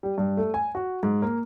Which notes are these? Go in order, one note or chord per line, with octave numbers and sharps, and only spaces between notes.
G3
G2
A3
G#5
F#4
G#2
A#3